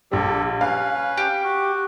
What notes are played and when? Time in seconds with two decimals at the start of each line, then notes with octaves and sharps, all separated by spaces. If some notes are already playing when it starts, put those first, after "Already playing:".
0.11 A#1 G3 G4 A4
0.61 C#4 B4 F5
1.17 G4
1.44 F#4